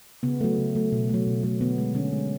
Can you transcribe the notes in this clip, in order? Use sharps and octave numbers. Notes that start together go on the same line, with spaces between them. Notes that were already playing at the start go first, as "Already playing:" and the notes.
C#3 B3
F#3 A3
C#3
F#3 A3
B2
F#3 A3
B2
F#3 A3
D3 B3
G#3
D3 C#4
G#3